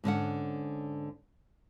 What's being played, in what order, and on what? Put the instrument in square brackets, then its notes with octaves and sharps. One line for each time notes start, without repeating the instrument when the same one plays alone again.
[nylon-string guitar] G#2 D3 C#4 F#5